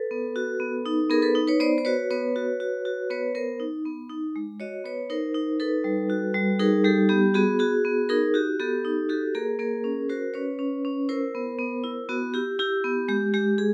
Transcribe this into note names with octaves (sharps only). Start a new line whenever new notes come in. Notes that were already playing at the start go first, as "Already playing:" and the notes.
Already playing: A4 B4
B3
F#4
B3
D#4
B3 G#4 A#4
A4 B4
D#4
B4 C#5
B3 C5 D5
C5
F#4 B4 C#5
B3 B4 C#5
F#4
F#4
F#4
B3 B4 C#5
B3 A#4 C5
D#4
B3
D#4
G#3
F#4 C#5 D#5
B3 B4 C#5
D#4 A#4 C5
D#4
D#4 A4 B4
G3
F#4
G3
D#4 G#4 A#4
G3 G4 A4
B3 G4
B3 F#4 G#4
F#4 G#4
B3
D#4 G#4 A#4
F#4 G4
B3 G4 A4
D#4
F#4 G4 A4
A#3 G#4 A#4
A#3 G#4 A#4
C#4
F#4 A#4 C5
C#4 B4 C#5
C#4
C#4
E4 A#4 C5
B3
B3
E4
B3 F#4
E4 G4
E4 G4
B3
G#3 G4
G#3 G4
G#4